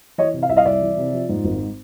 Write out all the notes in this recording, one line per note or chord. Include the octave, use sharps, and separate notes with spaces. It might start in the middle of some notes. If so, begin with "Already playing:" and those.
E3 C#5 D#5
C3
F5
C2 E5
D#5 F5
C2 D5 E5
E3
C3
F3
G#2
G#1